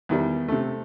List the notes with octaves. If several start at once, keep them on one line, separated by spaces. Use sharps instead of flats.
E2 D#3 G3
C3 A3